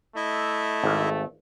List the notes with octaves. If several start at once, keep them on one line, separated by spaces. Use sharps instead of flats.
A3 E4 D#5 E5
G#1